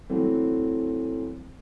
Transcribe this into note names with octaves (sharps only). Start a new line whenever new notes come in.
E3 F#3 A3 C4